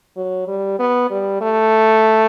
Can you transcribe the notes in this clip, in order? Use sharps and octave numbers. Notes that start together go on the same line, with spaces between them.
F#3
G3
B3
G3
A3